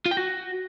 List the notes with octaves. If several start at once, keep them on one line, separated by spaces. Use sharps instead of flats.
F4
G5
F#4